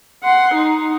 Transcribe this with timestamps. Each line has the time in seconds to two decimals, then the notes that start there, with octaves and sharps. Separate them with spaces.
0.24 F#5 C6
0.54 D#4